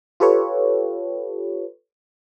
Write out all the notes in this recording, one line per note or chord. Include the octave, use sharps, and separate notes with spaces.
F4 G4 A4 B4 C#5